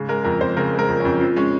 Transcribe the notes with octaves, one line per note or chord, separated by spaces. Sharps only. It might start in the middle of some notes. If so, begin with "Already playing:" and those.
Already playing: G#2 C#3
G#3 A#4
F2 A#4
F2 C5
C#3 A#4
G#3
A#4
F2
C#4
F2
F3 C4
G#3 C#4